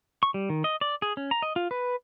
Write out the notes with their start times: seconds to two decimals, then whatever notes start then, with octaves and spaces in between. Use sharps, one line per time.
0.23 C#6
0.34 G3
0.50 D#3
0.64 D#5
0.81 D5
1.02 G#4
1.17 C#4
1.31 A#5
1.42 D#5
1.56 F4
1.71 B4